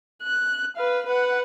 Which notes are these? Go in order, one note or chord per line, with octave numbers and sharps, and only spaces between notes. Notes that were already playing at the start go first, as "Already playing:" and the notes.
F#6
B4 F5
B4 F#5